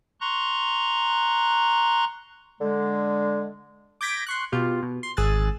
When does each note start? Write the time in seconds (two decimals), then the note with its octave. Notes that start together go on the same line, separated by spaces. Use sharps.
0.21 A#5 C6 C#6 F#6
2.61 D3 G#3
4.01 D6 G6 G#6 A#6 B6 D7
4.26 C6 C#6 F#6
4.52 B2 F4 G4
4.83 B2
5.03 C6
5.17 G#1 G#4 G#5 E6 F#6 A6